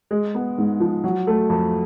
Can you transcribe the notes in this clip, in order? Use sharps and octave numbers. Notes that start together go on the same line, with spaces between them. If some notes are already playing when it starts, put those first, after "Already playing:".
G#3
B3
G#2
F3
F#3
A3
F2